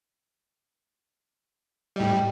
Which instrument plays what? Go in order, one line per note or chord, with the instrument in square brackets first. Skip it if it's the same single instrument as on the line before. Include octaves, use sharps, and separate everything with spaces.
[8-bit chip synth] A2 G3 [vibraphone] D#5 G5